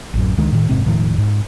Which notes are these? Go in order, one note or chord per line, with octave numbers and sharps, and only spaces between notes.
A1 F#2
C#2 D#3 G#3 D4
A2 D#3
F1 G#2 C3 C4
E1 A2 D#3 F3
G#2